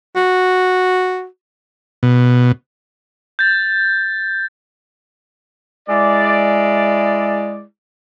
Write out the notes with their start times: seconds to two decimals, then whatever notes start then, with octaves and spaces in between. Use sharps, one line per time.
0.16 F#4
2.03 B2
3.39 G6 A6
5.89 G#3 E4 D5